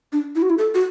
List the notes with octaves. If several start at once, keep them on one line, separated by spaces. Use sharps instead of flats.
D4
E4
F#4
E4
A4
F#4